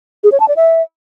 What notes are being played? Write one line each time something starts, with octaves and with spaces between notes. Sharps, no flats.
G#4
C#5
A5
D5
E5